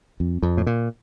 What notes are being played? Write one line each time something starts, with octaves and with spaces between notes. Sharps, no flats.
F2
F2
A2
A#2